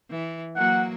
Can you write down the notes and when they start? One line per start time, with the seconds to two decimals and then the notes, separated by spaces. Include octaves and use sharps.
0.11 E3
0.57 F#3 A#3 F#5